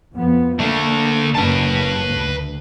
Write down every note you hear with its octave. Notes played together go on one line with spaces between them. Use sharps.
F2 F3 B3
D3 A3 A#3
F#1 C#3 A#3 B4 A5
D2